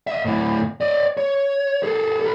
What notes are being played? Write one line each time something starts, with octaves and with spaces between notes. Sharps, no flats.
D#5 E5
D2 A2
D5 D#5
C#5
G#4 A4
A4 B4